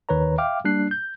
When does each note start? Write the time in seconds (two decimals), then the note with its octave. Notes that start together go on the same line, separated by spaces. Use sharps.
0.09 D#2 D#3 B4 C#5 A#5
0.38 E5 F5 G5 D6 F6
0.65 G3 A#3 D4 F#6 C7
0.91 G6